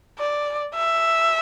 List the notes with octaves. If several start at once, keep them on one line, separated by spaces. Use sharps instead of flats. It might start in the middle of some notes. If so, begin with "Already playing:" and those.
D5
E5